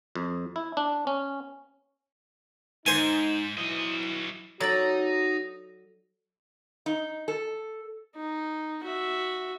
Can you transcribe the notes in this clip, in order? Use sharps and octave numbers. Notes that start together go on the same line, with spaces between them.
F2
E4
D4
C#4
G#2 D#4 C5 G#5
E3 F#3 E4 D#5
F#3 D#4 F#4 A4 D5 A#5 A6 F#7
D#4
A4
D#4
F#4 E5